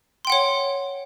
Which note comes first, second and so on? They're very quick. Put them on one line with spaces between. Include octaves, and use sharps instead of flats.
C6 G5 F#5 C#5